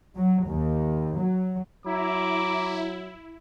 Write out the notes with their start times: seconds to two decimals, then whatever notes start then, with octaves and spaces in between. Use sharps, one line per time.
0.16 F#3
0.45 D#2
1.18 F#3
1.86 F#3 E4 A#5 D6